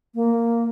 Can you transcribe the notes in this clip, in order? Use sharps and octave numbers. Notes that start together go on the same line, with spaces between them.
A#3